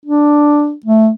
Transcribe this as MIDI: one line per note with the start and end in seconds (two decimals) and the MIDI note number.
0.06 0.74 62
0.85 1.10 57